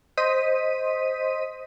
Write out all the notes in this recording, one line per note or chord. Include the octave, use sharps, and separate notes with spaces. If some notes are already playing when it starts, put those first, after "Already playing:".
C5 D#5 B6 D#7